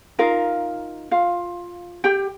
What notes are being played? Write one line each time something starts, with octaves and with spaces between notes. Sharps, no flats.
D#4 F4 A#4 F5
F4 F5
G4 G5